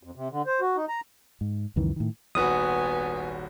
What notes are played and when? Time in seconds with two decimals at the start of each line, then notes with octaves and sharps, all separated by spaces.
0.03 F2
0.15 C3
0.31 D3
0.46 C5
0.61 F#4
0.77 D#4
0.88 A#5
1.41 G#2
1.76 C#2 F#2 D#3 E3
1.96 A2 D#3
2.35 D#1 G#1 B3 F#4 G#5 D#6